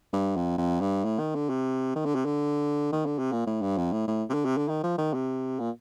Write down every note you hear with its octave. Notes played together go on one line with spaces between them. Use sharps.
G2
F2
F2
G2
A2
D#3
D3
C3
D#3
D3
C3
D3
D#3
D3
C3
A#2
A2
G2
F2
A2
A2
C3
D3
C3
D3
D#3
F3
D#3
C3
A#2